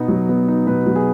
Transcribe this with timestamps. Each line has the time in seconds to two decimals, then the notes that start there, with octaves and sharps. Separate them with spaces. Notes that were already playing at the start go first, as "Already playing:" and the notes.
Already playing: B2 B3 D#4
0.08 F#3
0.29 B3
0.48 D#4
0.67 B2 B4
0.86 F#3
0.96 G#4